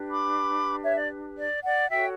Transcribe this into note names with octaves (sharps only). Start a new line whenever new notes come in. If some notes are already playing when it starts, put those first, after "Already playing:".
Already playing: D4 G4 B4
B5 D6
C#5 E5
D5
D5
D5 F#5
F#4 A4 C#5 E5 G5